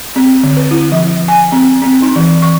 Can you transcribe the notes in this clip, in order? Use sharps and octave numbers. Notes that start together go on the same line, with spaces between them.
C4
D3
B4
E4
F3
G#5
C4
C4
D#4
E3
C#6